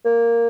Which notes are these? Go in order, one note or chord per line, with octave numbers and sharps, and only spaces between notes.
A#3